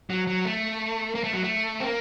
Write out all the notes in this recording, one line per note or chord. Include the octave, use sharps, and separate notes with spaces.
F#3
F#3
A3
A#3
A3
F#3
A3
C4
A#3